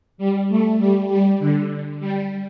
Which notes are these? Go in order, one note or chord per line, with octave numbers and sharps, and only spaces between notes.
G3
A3
G3
G3
D3
G3